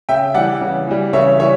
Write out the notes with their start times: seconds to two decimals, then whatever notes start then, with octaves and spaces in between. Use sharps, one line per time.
0.09 C#3 E5 G5
0.34 E3 G3 D5 F#5
0.61 C#3
0.87 E3 G3
1.13 C#3 C#5 E5
1.39 E3 G3 C#5 E5